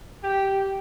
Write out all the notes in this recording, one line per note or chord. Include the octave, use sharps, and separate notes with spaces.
G4